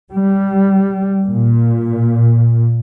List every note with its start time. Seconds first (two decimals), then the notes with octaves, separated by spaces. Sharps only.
0.12 G3
1.24 A#2